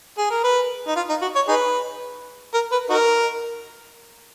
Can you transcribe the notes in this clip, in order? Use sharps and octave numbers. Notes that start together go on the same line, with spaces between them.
G#4
A#4
B4
D#4
F4
D#4
F#4
C#5
D#4 G#4 B4
A#4
B4
D#4 F#4 A#4